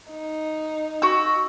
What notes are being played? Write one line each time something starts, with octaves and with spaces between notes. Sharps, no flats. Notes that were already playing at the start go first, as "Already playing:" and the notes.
D#4
F#4 E6